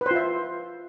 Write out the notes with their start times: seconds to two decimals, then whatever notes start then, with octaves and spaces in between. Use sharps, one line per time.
0.01 B4
0.06 C5
0.11 F4
0.16 E5